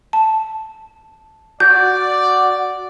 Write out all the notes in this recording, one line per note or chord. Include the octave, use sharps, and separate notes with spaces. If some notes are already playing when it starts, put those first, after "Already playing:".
A5
F#4 D5 G6